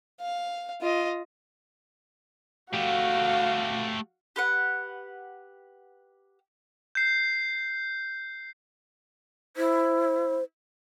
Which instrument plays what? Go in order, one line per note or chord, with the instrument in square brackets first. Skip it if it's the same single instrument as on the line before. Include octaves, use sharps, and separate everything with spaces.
[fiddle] F5
F4 D#5
[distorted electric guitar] A3 G4 [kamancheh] F#4 F5
[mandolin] G4 B4 F#5
[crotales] G6 C7
[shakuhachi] E4 [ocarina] C5